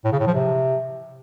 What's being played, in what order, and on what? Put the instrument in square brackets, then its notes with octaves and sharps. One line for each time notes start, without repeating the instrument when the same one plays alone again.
[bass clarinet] A2
C#3
A2
F3
C3